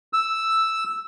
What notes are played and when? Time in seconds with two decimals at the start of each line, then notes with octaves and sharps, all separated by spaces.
0.13 E6